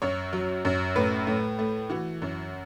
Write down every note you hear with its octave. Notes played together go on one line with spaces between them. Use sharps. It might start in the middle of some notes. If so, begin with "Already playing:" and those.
F#2 C#5
F#3
F#2
A2 B4
A2
A3
E3 F#4
F#2